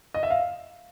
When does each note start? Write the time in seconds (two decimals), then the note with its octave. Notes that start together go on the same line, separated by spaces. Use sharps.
0.14 D#5
0.23 E5
0.30 F5